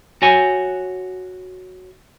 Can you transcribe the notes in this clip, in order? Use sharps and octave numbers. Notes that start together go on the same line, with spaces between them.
F#4 C#5 G#5